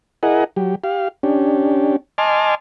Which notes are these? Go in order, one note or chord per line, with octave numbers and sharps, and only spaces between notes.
E4 G#4 A#4 D#5 F#5
F#3 G4
G4 F5
C#4 D4 G4
D#5 G#5 A5 C6 D6 F6